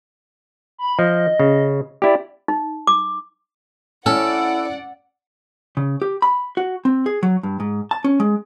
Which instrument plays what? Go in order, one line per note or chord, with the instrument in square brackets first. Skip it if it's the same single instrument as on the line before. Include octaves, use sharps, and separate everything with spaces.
[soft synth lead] B5
[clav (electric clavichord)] F3 [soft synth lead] D#5
[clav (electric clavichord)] C#3
[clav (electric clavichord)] E4 G4 [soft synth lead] D5
[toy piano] D#4
D6
[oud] C#4 [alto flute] E4 [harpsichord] A4 [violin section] D5 F#5
[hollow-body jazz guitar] C#3
G4
B5
F#4
C4
G#4
F#3
G2
G#2
A5
C#4
G#3